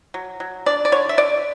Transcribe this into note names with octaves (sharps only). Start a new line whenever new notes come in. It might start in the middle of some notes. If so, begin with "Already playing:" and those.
F#3
F#3
D4 D5
D5
D3 C#5
E5
D3 D5